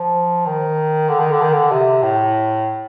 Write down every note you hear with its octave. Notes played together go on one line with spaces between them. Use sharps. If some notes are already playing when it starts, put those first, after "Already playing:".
Already playing: F3
D#3
D3
D#3
D3
D#3
D3
C3
A2